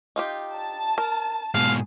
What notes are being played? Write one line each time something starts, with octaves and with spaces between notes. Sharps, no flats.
D#4 F4 G4
A5
A#4
G#2 B2 G#4 F5